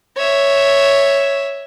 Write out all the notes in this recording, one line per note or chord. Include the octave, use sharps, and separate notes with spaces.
C#5 E5